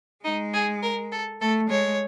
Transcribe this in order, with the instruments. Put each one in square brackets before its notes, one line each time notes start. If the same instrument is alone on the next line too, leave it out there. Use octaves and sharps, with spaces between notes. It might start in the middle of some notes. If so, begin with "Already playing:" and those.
[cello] G#3 [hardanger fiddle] D#4
[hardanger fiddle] G#4
A#4
A4
[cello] A3 [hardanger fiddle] A4
[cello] G#3 [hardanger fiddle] C#5